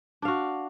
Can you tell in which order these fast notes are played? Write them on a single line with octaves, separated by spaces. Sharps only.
D4 F5 F#4